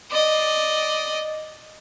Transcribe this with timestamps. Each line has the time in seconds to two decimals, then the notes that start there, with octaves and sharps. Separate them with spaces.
0.11 D5 D#5